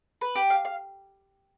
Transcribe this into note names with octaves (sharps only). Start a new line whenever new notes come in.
B4
G4
F5
F5